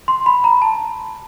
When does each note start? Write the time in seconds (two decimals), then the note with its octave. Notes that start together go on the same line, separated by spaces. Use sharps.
0.08 C6
0.26 B5
0.44 A#5
0.62 A5